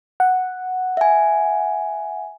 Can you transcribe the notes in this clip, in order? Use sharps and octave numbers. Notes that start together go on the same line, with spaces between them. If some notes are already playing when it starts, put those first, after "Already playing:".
F#5
E5 G#5